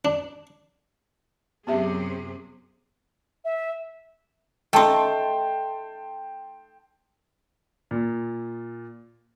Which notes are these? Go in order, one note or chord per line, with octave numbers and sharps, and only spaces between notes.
D4
F#2 C3 B3 G4 G#4 E5
E5
A3 D#4 G5 A5 C6
A#2